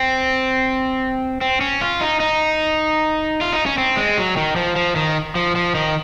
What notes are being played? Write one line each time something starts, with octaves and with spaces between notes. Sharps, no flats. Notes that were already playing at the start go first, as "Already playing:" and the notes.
Already playing: C4
C4
C#4
F4
D#4
D#4
F4
D#4
C#4
C4
G#3
F#3
D#3
F3
F3
D#3
F3
F3
D#3